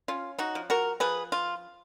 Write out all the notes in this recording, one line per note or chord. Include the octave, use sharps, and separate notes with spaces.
C#4 F4
D#4 F#4
F3
F#4 A#4
F3 G#4 B4
F4